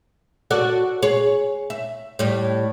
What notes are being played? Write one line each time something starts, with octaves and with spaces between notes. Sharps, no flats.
F#4 A4 D5
G#4 C#5
E5
A2 G3